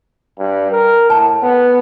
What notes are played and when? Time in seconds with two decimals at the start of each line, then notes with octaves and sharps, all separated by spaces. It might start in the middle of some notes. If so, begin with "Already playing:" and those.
0.38 G2
0.71 A#4
1.10 A2 A5
1.43 B3